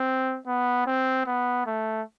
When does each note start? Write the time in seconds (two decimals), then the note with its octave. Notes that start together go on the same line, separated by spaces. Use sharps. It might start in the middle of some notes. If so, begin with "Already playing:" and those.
Already playing: C4
0.47 B3
0.86 C4
1.26 B3
1.66 A3